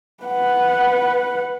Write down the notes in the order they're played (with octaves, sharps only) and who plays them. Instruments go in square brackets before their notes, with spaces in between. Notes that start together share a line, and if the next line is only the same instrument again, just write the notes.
[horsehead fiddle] B4 F#5